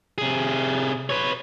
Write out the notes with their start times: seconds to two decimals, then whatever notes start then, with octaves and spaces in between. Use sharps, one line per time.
0.18 C3 G#4
1.09 B4 C#5